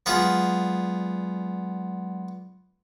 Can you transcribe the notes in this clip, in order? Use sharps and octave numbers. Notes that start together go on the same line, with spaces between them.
F#3 G#3 B3 F4 G#4 D5